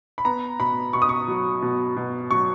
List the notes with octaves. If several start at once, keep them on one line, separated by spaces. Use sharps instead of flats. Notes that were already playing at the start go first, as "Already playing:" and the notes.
B5
B3 A#5
B2 B5
B2 C#6
D#6
C#6
F#3
B2
B2
F#3 C#6